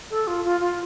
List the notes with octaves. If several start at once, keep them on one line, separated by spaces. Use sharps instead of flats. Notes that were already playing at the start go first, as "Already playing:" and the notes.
A4
F4
F4
F4